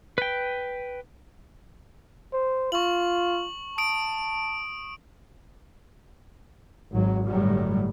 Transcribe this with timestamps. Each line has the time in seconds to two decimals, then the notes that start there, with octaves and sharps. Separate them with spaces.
0.18 B4 G5
2.33 C5
2.72 F4 C#6 F#7
3.78 A5 D#6 D7
6.92 G#1 F#3
7.26 G1 A2 F#3 G3